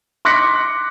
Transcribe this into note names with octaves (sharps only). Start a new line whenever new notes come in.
C6 D6 F#6 A#6 B6 C#7